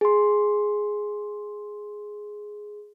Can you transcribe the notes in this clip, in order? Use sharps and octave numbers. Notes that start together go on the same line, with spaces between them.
G#4 C6